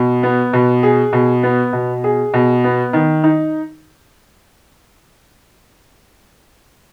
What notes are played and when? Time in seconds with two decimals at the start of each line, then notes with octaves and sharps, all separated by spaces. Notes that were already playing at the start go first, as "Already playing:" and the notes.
Already playing: B2
0.23 B3
0.53 B2
0.83 G#4
1.13 B2
1.43 B3
1.73 B2
2.04 G#4
2.34 B2
2.64 B3
2.93 D#3
3.24 D#4